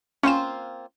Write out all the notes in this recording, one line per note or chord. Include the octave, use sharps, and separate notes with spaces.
A#3 C4 C#4 F4 E7